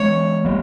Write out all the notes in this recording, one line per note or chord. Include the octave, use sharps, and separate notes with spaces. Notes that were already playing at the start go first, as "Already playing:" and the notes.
Already playing: E3 G#3 C#4 C#5
G3 A#3